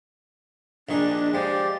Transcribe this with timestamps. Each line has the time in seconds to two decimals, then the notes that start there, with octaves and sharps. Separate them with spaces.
0.89 A#1 D#3 D4 G#4
1.34 F3 G#3 G4 D5